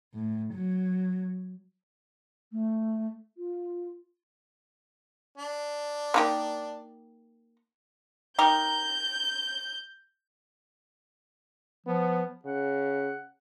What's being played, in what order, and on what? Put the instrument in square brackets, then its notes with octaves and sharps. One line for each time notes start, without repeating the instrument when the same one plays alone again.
[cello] A2
F#3
[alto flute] A3
F4
[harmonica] D4
[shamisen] A#3 D#4 G4
[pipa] D#4 G4 A#4 [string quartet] G6
[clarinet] F3 [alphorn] B3
[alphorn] C#3 [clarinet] F#5